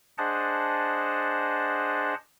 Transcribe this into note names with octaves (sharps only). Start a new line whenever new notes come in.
D4 G#4 C5 D#5 F#5 A5